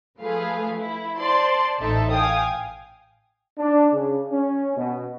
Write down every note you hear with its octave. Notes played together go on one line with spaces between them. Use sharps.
F3 A3 G#4 B4 F5
E4
C5 D5 A5 C6
A1 D#4 A4 E5
F5 G5 G#5 D#6
D4
C#3
C#4
B2